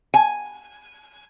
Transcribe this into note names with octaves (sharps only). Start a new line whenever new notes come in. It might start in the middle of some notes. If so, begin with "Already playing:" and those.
G#5